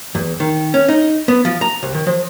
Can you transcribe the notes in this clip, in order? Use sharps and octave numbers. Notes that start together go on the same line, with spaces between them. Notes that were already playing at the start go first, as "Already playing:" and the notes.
E2
D#3
C#4
D#4
B3
F3
A#5
C2
D#3
F3